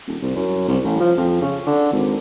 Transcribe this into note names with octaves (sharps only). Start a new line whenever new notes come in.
D#1
C2
F#2
C2
A1
F3
F2
C#3
D3
G#1